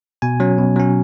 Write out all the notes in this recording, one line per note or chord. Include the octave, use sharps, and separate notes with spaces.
B2 G#5
F#3 C#4
B2
F#3 C#4